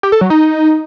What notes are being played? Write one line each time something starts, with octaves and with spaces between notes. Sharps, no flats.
G4
A4
F#3
D#4